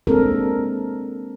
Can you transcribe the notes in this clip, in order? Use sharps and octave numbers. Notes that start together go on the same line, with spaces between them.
G#3 A#3 C4 D4 A4 A#4